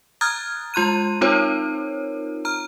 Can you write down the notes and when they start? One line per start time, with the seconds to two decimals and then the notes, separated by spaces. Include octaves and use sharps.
0.21 A#5 D#6 F6 F#6 G#6 A6
0.74 G#3 F4 C6 F#6 D#7
1.21 C4 D#4 F4 A#4 C5 C#5
2.45 A#5 F6